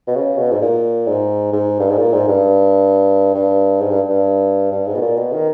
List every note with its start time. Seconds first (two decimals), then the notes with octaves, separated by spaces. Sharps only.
0.08 B2
0.16 C#3
0.38 B2
0.52 G#2
0.62 A#2
1.08 G#2
1.53 G#2
1.80 G2
1.90 G#2
1.98 A#2
2.13 G#2
2.29 G2
3.35 G2
3.81 G#2
3.90 G2
4.10 G2
4.72 G2
4.87 G#2
4.95 B2
5.02 A#2
5.17 B2
5.33 D#3